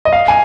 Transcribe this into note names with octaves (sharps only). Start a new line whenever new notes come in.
D#5
F5
G#5